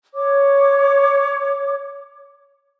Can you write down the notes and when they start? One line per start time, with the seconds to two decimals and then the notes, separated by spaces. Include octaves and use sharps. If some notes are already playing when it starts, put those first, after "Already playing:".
0.14 C#5 D6